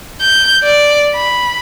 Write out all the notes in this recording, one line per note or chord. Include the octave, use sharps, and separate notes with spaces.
G6
D5
B5